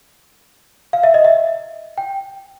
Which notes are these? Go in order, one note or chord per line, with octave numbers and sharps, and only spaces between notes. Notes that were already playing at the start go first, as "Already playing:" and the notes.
F5
E5
D#5
E5
G5